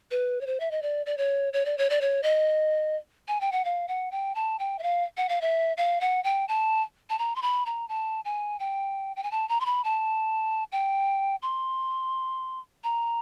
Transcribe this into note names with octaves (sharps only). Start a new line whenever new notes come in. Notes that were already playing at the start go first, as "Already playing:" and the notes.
B4
C#5
C5
E5
D#5
D5
D5
C#5
C#5
D5
C#5
D5
C#5
D#5
G#5
G5
F#5
F5
F#5
G5
A5
G5
E5
F5
F#5
F5
E5
F5
F#5
G5
A5
A5
A#5
C6
B5
A#5
A5
G#5
G5
G5
G#5
A5
A#5
C6
B5
A5
G5
C6
A#5